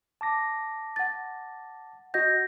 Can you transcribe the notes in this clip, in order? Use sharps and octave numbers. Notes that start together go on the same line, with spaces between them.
A5 D6 A#6
F#5 A6
F#4 D#5 F#5 G6 A#6